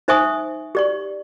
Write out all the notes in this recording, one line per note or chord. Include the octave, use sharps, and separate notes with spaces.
D#4 C5 E5 G#5 C#6 D#6
G4 D5 C#6